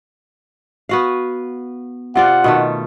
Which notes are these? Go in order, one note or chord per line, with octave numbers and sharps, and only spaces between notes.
B3 F#4 F5
C3 F4 D5 F#5
B2 D#3 A3